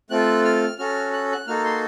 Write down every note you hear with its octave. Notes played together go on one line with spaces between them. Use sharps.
A3 C4 F4 A4 F#6
F6
C#4 F#4 A4 F6
F#6
F#6
A#3 D#4 F#4 A4 F6
C6